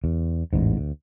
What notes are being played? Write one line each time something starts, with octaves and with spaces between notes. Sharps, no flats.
E2
A1 E2 G#2
D2